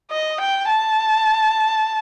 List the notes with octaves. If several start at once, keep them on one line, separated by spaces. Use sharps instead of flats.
D#5
G5
A5